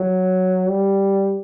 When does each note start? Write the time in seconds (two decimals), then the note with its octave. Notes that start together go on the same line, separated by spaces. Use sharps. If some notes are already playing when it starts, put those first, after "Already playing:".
Already playing: F#3
0.69 G3